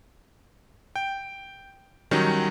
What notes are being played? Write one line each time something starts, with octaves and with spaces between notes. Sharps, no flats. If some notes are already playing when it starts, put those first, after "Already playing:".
G5
D#3 F#3 G3 C#4 D#4